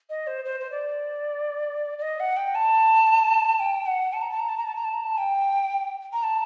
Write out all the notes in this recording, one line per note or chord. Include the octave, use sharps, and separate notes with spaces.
D#5
C5
C5
C5
D5
D5
D#5
F#5
G5
A5
G5
F#5
A5
A#5
A5
A#5
A5
A#5
A5
A#5
A5
A#5
A5
G5
A#5
A5